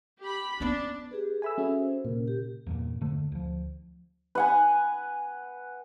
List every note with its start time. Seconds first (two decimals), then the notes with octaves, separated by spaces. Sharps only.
0.22 G4 B5
0.60 B3 C#4 D4
1.11 G4 G#4 B4
1.42 A4 E5 G#5 B5 E6
1.58 C#4 F#4 G#4
1.80 C5
2.05 A#2 C#3 A#4
2.28 G4
2.67 E2 G2 A#2
3.01 F#1 D3 A3
3.32 D2 F3
4.35 B4 F#5 G#5